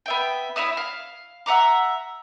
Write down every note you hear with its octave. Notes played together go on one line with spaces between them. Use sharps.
B3 E5 G5
E4 C#5 E5 D#6
F5
E5 F#5 A#5 D6